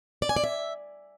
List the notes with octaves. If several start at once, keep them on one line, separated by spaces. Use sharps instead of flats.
D5
G#5
D5
E5